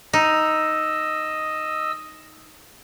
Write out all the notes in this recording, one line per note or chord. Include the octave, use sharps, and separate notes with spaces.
D#4 D#5 E6